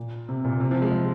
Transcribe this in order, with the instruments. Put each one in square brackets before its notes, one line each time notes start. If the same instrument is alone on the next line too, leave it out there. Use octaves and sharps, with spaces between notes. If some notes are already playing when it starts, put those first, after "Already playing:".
Already playing: [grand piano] A#2
C3
A#2
C3
F3
G#3